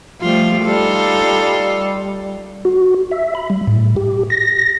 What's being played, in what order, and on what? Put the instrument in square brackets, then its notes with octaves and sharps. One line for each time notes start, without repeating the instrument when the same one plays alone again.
[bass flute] F3 [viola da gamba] G3 A3 F4
[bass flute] G3 [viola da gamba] D#4 F4 A4
[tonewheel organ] F#4
E5
B5
G3
A2
G4
A#6